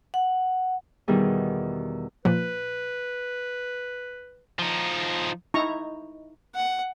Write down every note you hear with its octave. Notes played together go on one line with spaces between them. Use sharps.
F#5
E2 B2 D#3 G3 G#4
A#2 F3 B4
F3 D#4
D#4 E4 A#5 C#6
F#5